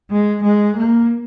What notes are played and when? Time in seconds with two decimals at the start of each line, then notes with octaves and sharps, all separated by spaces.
0.11 G#3
0.43 G#3
0.77 A#3